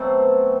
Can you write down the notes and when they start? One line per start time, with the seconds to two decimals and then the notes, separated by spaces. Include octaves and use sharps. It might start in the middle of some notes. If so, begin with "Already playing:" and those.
Already playing: B2 F#3 A3 C4